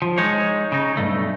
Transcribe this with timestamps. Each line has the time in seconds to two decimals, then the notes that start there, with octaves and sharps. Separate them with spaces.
0.02 F3
0.18 G#3 D#4 C#5
0.72 C#3 D#4
0.97 B1 G2 A3